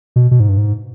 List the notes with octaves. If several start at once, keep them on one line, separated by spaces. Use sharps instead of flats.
B2
B2
G#2
G2
G#2